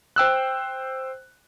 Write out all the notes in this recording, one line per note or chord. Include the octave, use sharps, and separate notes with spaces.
C5 G5 E6 F#6